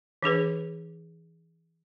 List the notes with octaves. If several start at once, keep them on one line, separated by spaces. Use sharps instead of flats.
E3 D4 G#4 B4